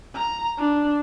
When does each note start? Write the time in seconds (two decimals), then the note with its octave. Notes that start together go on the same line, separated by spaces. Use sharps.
0.14 A#5
0.57 D4